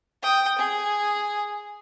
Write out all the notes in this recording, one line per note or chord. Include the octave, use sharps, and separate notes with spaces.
G5 D#6
G#4